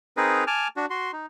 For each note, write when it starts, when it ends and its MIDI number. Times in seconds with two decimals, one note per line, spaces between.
0.17 0.44 60
0.17 0.44 63
0.17 0.44 68
0.17 0.44 70
0.17 0.44 71
0.47 0.68 80
0.47 0.68 81
0.47 0.68 86
0.47 0.68 89
0.76 0.86 62
0.76 0.86 66
0.90 1.11 66
0.90 1.11 84
1.13 1.26 63